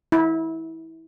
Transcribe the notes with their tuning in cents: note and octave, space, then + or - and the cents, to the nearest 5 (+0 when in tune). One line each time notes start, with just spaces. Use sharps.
E4 -25